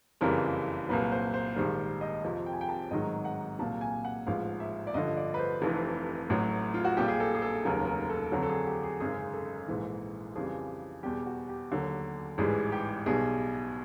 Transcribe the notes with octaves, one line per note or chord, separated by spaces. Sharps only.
F#1 F2 C#3 E3 G3 A#4
C2 A#2 F#3 B4
C5
C5
A#1 G#2 D#3 G3 C5
D#5
F2 C3 F3
G5
G#5
G5
A5
A1 G#2 D#3 F#3 D#5
F#5
C2 A#2 F#3 A5
G#5
F#5
A1 G#2 F3 F5
E5
D5
A1 G2 D3 F3 D#5
D5
B4
C5
F1 F2 C3 E3
A1 A2 F#3
F4
F#4
A#1 A#2 G3 G4
G#4
A4
G#4
A4
F1 D#2 C#3 F#3 A#4
A#4
A4
F2 D3 F#3
A4
G#4
G4
G#4
G#1 F#2 C#3 G#4
A4
A#1 G#2 E3
F2 C#3 E3 G3 G#4
E2 B2 G3 G4
F#4
G4
D#2 D3 F#3
A1 G#2 E3 G3 G#4
G4
B1 B2 G3 G#4